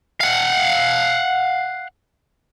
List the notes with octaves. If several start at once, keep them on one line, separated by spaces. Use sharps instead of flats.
F5 F#5